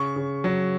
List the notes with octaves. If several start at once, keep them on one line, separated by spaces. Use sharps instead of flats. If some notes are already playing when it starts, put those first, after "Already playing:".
Already playing: C#3 C#6
C#3
F#3